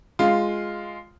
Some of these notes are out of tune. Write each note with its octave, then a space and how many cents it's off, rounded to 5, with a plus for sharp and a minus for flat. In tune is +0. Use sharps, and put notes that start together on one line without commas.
G#3 +0 F4 +0